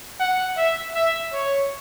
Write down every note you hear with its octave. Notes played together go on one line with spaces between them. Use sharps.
F#5
E5
E5
C#5